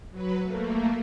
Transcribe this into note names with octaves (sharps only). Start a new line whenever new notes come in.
F#3 B4
A3 A#3